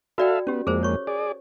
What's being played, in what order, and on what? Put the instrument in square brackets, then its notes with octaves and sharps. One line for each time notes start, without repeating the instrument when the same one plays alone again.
[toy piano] F#4 D5 G5 [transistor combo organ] A4 E5 F5
[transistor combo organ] B3 [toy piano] C#4 G4
[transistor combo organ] F2 G#3 A#3 [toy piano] G#4 A#4 C5
[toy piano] C#5 C#6
[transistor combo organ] G#4 D5